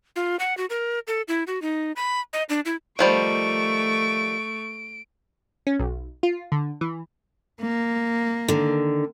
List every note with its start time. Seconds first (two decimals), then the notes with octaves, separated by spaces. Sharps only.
0.16 F4
0.40 F#5
0.57 F#4
0.70 A#4
1.07 A4
1.28 E4
1.47 F#4
1.62 D#4
1.96 B5
2.33 D#5
2.49 D4
2.65 E4
2.99 D#3 F3 G3 A3 C#6 D7
5.67 C#4
5.79 B1
6.23 F4
6.52 D3
6.81 E3
7.61 A#3
8.48 D3 D#3